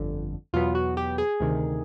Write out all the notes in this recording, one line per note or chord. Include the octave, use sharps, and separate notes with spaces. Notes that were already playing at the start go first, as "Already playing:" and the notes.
Already playing: G1 F2 D3
E2 B2 F#3 B3 F4
F#4
G4
G#4
D2 C3 D#3